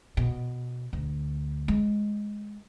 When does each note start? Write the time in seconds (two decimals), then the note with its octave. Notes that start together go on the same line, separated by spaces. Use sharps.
0.17 B2
0.93 D2
1.68 G#3